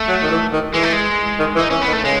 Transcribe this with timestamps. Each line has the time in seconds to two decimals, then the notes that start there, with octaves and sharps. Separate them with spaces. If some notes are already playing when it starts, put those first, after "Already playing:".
Already playing: A3
0.09 F#3
0.23 D#3
0.30 E3
0.53 D#3
0.74 E3 G#3
0.83 A3
0.93 G#3
1.39 D#3
1.55 E3
1.59 D#4
1.70 E3 C#4
1.82 B3
1.88 D#3
1.93 A3
2.04 C#3 G#3